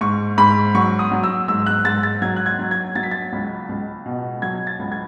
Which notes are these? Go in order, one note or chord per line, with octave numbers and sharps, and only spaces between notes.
G#2 C#6
G#2 B5
F#3 C#6
D#6
F#3
E6
G#2 E6
F#6
G#2 A6
A6
F#3 G#6
F#6
G#6
F#3
G#6
F#3 A6
B6
A6
C#2
C#2
B2
F#3 G#6
A6
C#2
G#6